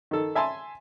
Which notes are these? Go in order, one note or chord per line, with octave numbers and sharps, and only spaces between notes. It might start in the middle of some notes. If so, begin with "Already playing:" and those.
D#3 A4
E5 G#5 A5 C6